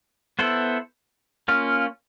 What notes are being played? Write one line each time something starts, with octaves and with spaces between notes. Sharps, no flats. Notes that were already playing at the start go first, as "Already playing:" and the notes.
B3 E4 A4 C5
A#3 C#4 F4